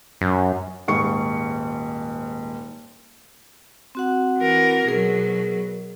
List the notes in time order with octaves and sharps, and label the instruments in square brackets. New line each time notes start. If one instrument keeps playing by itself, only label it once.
[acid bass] F#2
[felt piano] D#1 G#2 C#6 C#7
[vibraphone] C4 F#4 F#5
[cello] E3 A#4
[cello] B2 F#3 [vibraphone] G#4 A#4